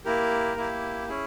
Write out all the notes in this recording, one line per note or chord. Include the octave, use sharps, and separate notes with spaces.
A#3 E4 G4 A#4
A#3 E4 G4
C#4 E4 G#4